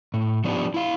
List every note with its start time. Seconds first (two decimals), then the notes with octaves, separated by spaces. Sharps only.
0.14 A2
0.44 F3 B3 D4 D#4 F4 G4
0.74 E4 F5